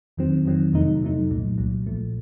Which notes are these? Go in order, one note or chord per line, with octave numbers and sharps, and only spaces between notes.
F2 D#3 F#3 C4
F2 D#3 F#3 C4
F2 C3 F#3 A3 D#4
F2 C3 F#3 A3 D#4
C2 A#2 F#3
C2 A#2 F#3
A#1 A#2 F3 A3